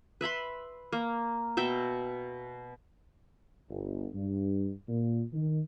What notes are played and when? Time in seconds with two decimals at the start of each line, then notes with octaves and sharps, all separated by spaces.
0.21 B4 E5 B5 C6
0.92 A#3
1.57 B2 E5 G5
3.69 G1
4.14 G2
4.89 A#2
5.33 D#3